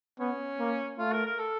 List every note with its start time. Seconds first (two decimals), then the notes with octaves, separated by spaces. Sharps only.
0.20 B3 C#4
0.59 A#3
0.98 A3 F4
1.12 A#4
1.26 A#4
1.39 A4